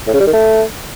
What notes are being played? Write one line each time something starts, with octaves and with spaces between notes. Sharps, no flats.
A2
C#3
G3
D#3
A3